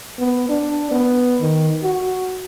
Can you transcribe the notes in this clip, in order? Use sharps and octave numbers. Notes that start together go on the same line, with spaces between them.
B3
D4
B3
D#3
F#4